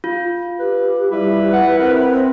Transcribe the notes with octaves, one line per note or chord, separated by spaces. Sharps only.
F4
G4 B4
G3 E4 B4
F#5
C4 A#4